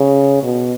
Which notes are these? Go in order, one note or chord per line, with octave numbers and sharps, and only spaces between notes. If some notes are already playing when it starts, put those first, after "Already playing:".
Already playing: C#3
B2